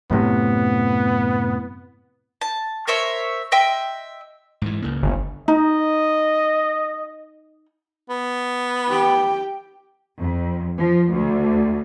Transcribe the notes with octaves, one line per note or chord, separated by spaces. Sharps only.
F#2 A2 C3 B3
A5
A#4 C5 C#5 E5
D#5 E5 G5 C6
G#2 E3
C#2 C#3 A#3
G1
D#4 D#5
B3
G4 G5
F2
F3
D2